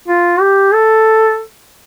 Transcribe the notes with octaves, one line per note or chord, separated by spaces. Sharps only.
F4
G4
A4